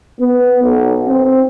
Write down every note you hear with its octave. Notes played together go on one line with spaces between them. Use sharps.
B3
B1
C4